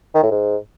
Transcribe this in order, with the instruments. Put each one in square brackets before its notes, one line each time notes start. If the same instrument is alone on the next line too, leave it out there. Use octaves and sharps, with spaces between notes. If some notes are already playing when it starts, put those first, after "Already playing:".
[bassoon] D#3
A2
G#2